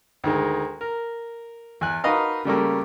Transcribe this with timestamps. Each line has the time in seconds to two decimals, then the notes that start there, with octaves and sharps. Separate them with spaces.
0.24 D2 D#3 G#3
0.81 A#4
1.81 E2 G#5 F#6
2.04 D#4 F#4 A#4 B4 D#5 F5
2.45 C#3 G3 A3 A#3